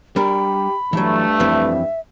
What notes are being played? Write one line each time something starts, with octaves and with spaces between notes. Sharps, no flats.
G3 D4 G4 A#4 B5
G2 E3 F#3 A3
F2 E3 C4 E5